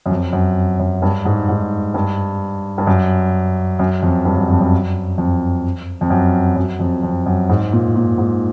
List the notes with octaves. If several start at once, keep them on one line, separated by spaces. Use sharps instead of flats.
F#2
F2
F#2
F#2
G2
G#2
G#2
G2
G2
F#2
F#2
F2
G2
F#2
F2
F#2
F2
F2
F#2
F#2
F2
F2
F#2
G#2
A#2
A#2
G#2